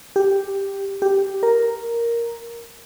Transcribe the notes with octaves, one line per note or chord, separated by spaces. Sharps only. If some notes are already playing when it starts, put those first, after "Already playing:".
G4
G4
A#4